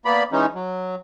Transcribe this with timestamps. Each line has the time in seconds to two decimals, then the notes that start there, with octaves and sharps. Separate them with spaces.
0.05 A#3 B3 D5 B5
0.32 E3 G#3 C#4 D#4
0.55 F#3